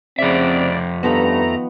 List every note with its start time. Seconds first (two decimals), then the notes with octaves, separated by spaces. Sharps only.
0.19 F2 C#3 C4 D5 E5
1.03 G2 D#3 F3 A3 B3 A#5